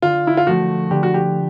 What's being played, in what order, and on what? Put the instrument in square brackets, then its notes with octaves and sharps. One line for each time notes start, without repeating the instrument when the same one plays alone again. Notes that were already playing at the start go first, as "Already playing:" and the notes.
[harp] D3 [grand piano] F4
[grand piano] E4
F4
[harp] F3 A3 [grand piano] F#4
[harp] D3 [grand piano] G4
[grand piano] F#4
G4